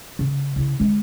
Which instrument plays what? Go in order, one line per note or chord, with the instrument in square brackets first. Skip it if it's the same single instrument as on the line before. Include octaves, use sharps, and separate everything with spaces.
[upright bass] C#3
C#3 E4
D3 G#3